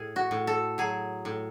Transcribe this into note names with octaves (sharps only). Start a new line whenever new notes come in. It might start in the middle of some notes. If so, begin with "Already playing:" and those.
Already playing: A2 G#4
F#4
A2
A4
F#3 G#4
A2